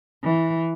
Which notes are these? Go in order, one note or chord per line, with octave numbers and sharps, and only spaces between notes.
E3